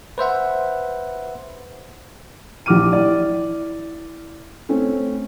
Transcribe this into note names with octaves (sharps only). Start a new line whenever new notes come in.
B4 C5 E5 F#5
A#1 E3 G4 D6 F6 D#7
E4 D5
A3 C4 C#4